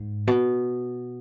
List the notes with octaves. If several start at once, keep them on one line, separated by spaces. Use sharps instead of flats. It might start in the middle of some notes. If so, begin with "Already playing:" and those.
Already playing: G#2
B2